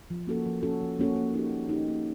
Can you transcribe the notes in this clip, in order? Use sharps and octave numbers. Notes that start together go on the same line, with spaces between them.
F3
A#3 C#4 F#4 A4
F3
A#3 C#4 F#4 A4
F3
A#3 C#4 F#4 A4
A#3
D#4 G4
A#3
D#4 G4
A#3